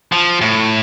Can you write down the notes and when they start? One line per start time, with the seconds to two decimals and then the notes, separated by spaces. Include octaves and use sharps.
0.12 F3
0.41 A2